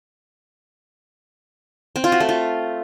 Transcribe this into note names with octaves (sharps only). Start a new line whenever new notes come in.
C4
F4
F#4
A3
F4